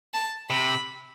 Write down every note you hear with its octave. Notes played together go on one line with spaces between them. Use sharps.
A5
C3 B5